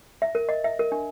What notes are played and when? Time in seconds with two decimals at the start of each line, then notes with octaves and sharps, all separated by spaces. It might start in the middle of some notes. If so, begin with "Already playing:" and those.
0.22 E5
0.35 A#4
0.49 D#5
0.64 E5
0.79 A#4
0.92 D4